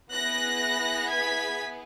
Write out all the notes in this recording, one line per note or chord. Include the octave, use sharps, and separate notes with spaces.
B3 E4 G#4 F#6 A#6
G#6 B6